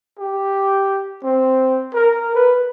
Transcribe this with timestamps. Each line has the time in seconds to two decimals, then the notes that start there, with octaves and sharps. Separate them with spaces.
0.19 G4
1.24 C4
1.94 A#4
2.35 B4